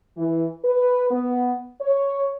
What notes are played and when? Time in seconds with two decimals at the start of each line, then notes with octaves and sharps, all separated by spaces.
0.17 E3
0.63 B4
1.11 B3
1.81 C#5